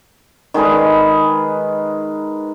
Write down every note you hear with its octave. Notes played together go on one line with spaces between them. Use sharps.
D#3 G#3 G#4 B4